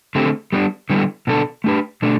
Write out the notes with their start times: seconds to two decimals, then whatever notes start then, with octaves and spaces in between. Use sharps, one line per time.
0.15 D3 A3 C4 G4
0.52 G3 B3 D4
0.90 D3 G3 B3 E4 A4
1.27 B2 B3 D4 A4
1.64 A3 D4 G4 B4
2.02 B2 A3 D4